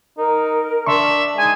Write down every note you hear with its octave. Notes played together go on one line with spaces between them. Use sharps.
D#4 A#4
D4 E5 C6 C#6
G#3 D#4 G#5